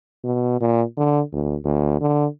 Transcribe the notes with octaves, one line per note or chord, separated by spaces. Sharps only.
B2
A#2
D3
D2
D2
D3